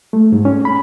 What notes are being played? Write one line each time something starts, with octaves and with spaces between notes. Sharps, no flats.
A3
G#2
C#4
B5